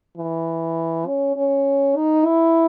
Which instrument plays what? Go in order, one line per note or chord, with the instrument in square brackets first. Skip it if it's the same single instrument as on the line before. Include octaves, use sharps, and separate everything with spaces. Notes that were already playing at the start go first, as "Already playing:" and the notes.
[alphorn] E3
C#4
C#4
D#4
E4